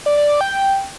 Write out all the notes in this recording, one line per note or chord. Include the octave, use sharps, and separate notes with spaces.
D5
D5
D5
G5